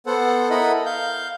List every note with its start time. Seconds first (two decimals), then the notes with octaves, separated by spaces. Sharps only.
0.06 B3 A4 C5 F#5
0.50 E4 A4 A#4 D#5 F#5 B5
0.86 F5 G6